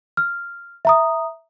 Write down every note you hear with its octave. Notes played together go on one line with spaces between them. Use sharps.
F6
E5 A#5 D#6